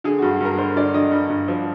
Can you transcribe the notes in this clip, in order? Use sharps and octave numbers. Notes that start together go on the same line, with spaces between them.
D3 G#4
F#4
G2
F#4
G2 A#4
D3 C5
D3 D5
D3 D#5
G2
G2
F3